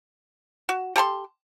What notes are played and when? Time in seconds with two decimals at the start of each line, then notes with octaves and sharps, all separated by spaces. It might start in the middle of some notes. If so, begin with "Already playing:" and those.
0.69 F#4
0.96 G4 A4 A#5 C6